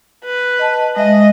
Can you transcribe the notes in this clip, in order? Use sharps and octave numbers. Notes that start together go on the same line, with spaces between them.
B4
D#5 A5
G#3 D#5 E5